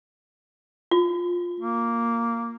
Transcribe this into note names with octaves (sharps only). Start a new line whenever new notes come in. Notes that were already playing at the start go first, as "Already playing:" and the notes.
F4
A#3